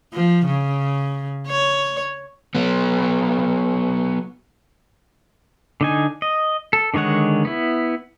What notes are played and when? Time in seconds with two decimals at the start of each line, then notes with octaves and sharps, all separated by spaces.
0.13 F3
0.46 C#3
1.48 C#5
2.55 F#3 B3
5.81 D3 D#4 G#5
6.22 D#5
6.73 A4
6.94 D3 D#3 G#3 C#5 F#5
7.45 B3 E4